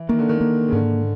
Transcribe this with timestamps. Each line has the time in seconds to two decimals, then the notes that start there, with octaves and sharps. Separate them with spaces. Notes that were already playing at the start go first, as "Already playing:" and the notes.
Already playing: E3
0.09 D#3 A#3
0.19 D3
0.29 D#3
0.41 A#3
0.68 C#3
0.72 G#2 D3